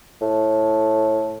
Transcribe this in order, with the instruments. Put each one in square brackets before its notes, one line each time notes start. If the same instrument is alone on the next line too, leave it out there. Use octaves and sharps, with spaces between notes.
[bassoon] A2